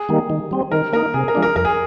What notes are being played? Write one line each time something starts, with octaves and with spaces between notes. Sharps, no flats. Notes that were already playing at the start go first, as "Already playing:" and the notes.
Already playing: G#4
D#3 G3 A#3
D#3
G3 C4
D#3 A#4
A#3 D#4 A#4
C3 G#4
A#4
F3 G#3 D4
A#4
F2 A#4
G#4